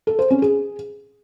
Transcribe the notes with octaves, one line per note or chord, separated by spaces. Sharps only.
A4
C5
C#4
G#4